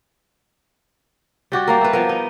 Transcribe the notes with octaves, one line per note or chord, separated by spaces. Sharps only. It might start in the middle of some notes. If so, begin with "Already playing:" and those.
G3 F#4 G4 D5
G3 A#3 A#4
E4 B4
F3 B3 A#4
D#4